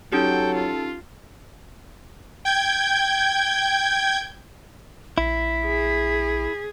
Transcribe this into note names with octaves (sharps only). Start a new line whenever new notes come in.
F#3 C#4 D#4 G4 A4 G5
F4
G5 G6 G#6
A#1 E4 B6
G#4